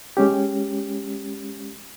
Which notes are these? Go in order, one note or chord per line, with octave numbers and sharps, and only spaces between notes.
G#3 C#4 G4